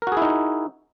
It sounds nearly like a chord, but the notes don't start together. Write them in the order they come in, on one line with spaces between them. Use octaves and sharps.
A#4 F#4 G#4 E4 D#4